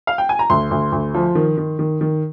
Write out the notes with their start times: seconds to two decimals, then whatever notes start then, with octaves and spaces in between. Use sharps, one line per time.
0.07 F5
0.18 G5
0.29 G#5
0.39 A#5
0.50 D2 C6
0.71 D2
0.92 D2
1.14 F3
1.35 D#3
1.58 D#3
1.79 D#3
2.01 D#3